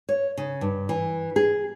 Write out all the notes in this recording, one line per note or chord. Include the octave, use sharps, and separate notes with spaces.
C#5
C#3
G2
E3
G#4